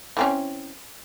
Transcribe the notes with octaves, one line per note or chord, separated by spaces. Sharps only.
E3 C4 C#4